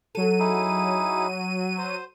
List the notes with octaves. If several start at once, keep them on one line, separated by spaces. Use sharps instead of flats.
F#3 A4 D#7
D#4 E4 G#4
C5